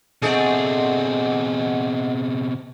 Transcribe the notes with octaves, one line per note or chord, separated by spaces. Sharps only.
B2 A3 C4 D4 G#4 D#5 F#5